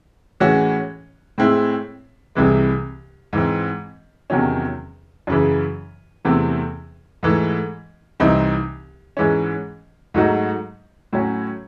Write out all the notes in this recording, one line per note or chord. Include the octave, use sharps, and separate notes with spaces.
A2 E3 G#3 C#4 F#4
A2 G#3 C4 E4
C2 C3 E3 G#3
G#2 E3 C4
E2 C3 D#3 F#3 C#4
F#2 C#3 E3
E2 C3 E3 A3 C4
G#2 E3 A3
C2 C3 E3 C4 D#4
G#2 E3 G#3 C#4
G#2 F#3 A3 D#4 F#4
A2 F#3 C#4